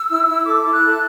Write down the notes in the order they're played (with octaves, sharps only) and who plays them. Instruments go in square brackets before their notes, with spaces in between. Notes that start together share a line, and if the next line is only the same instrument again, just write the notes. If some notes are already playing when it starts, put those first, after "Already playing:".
Already playing: [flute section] E6
E4
E4
A4 D6
E4
F#6
A4